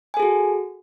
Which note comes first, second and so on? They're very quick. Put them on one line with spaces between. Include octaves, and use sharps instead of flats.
G#5 A4 G#4 F#4